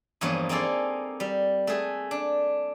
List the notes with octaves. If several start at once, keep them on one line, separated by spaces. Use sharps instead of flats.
E2 G2 F3 A#3 C#5 D#5
A#3 C4 D#4 G#4 A4 D5
G3
A3 G#4
D4